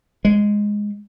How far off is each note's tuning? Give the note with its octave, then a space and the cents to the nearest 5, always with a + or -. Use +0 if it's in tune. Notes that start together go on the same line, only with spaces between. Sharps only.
G#3 -5